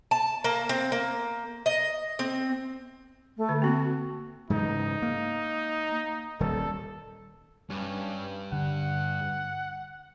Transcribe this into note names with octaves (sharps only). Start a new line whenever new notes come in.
A5
A#3
C4
A#3
D#5
C4
A3
D3
A#3 C4 F#4
G#2 C#3 E3 D#4
A#3
D#1 D#3 G3 A4
G2 C#4
D3 F#5